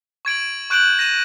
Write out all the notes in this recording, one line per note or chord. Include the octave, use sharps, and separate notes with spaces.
C#6 G#6 D7 F#7
C#6 F#6 G6 D7 E7 F#7
A#6 D#7 E7